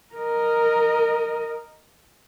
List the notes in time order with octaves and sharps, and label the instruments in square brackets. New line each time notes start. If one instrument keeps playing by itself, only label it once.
[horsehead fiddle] A#4 D#5